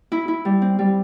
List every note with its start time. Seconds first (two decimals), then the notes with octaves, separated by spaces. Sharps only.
0.12 E4
0.28 E4
0.45 G3
0.62 C4
0.79 G3